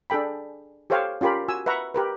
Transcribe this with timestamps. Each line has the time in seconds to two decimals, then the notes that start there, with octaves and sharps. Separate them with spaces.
0.10 D4 G#4 A4 G5 B5
0.90 G4 A4 C5 C#5 F5 G5
1.21 C#4 F4 G4 A#4 B5
1.48 F#4 G#5 E6
1.66 B4 E5 F#5 A#5 C#6
1.94 G4 A#4 B4